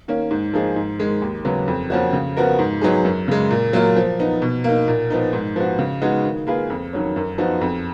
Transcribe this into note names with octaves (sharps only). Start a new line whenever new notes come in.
D#3 A#3 C#4
G#2
F3 A#3 D#4 G#4
G#2
D#3 G#3
D#2
C#3 F#3 B3
F2
F3 A#3 C#4 F#4
C#3
F3 B3 F#4 A#4
G#2
F#3 B3 D#4 G#4
F#2
C#3 G#3
A#2
F#3 A#3 F4
F3
B3 D#4
B2
A#3 D#4
A#2
F3 B3 D#4
G#2
F3 B3 F#4
C#3
G#3 B3 D#4 F#4
D#3
A#3 F4 G#4 B4
F2
D#3 F#3 C#4
F#2
F3 B3 D#4 F#4
F2